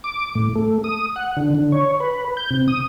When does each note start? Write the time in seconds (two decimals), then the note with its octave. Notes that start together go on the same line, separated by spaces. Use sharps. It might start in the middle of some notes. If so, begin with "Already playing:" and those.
0.04 D6
0.35 A2
0.56 A3
0.84 D#6
1.16 F#5
1.37 D3
1.55 D3
1.72 C#5
2.00 B4
2.37 G6
2.51 C3
2.68 D#6